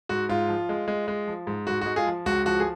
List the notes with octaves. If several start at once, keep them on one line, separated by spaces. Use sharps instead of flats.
G#2 F#4
G#2 F4
F3
G#3
G#3
G#3
F3
G#2
G#2 F#4
G#3 F#4
F4 G#4
F3
C#2 F#4
F3 F#4
G#4